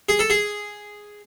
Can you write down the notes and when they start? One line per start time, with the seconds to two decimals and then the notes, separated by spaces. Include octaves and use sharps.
0.09 G#4
0.19 A4
0.30 G#4